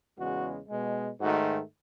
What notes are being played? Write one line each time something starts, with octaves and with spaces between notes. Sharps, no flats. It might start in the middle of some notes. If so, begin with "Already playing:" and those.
E2 C#3 G#3 F#4
B2 G#3
G#2 D#3 A3 F#4